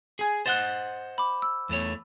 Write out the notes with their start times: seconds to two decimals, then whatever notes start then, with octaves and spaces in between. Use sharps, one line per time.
0.19 G#4 G#5
0.46 C5 D#5 F#5 F#6 A6
1.18 B5 D6
1.42 E6
1.69 E2 A3 C#5